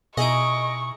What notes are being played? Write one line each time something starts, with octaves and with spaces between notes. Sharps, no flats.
B2 D#4 E4 G#4 D#5 C#6 D7